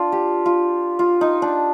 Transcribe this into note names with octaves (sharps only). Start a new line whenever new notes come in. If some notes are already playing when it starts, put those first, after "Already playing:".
Already playing: D4 F4
G4
F4
F4
D#4
D4